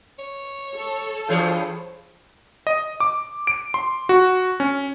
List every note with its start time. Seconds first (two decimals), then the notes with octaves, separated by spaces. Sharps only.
0.19 C#5
0.76 A4
1.28 G2 E3 F4 G#4 C5 C#5
2.67 D#5
3.00 D6
3.47 D7
3.74 C6
4.09 F#4
4.60 C#4